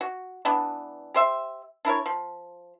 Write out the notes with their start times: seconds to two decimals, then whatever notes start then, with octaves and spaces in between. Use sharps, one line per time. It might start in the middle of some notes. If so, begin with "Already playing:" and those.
0.01 F#4
0.45 E3 B3 D4
1.14 G4 C5 E5
1.85 D4 E4 A#4 C#5
2.06 F3